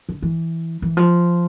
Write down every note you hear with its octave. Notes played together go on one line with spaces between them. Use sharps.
D3
E3
E3
F3